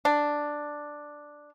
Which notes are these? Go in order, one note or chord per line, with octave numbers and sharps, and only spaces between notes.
D4